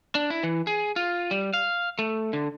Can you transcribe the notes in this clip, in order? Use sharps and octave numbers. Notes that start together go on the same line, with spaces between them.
D4
E4
E3
G#4
F4
G3
F5
A3
D3